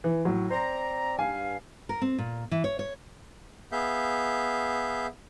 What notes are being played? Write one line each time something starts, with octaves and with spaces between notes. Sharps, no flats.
E3
A2 F#3
C4 C5 D5 A#5
G2 F5 G#5
A#4
C4
A#2
E3
C#5
C#5
B3 G#4 E5 F5 G6